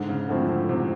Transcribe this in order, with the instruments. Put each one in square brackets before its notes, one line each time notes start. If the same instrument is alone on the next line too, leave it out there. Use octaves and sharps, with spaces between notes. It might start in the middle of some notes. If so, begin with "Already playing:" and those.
Already playing: [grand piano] G#2 [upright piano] D3
[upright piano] C#3
[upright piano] D3 [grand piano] F3 A3 C4 E4
[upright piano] D3
[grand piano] G#2 [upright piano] C3